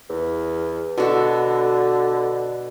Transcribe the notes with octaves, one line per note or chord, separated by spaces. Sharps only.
E2
B2 D3 F#4 A4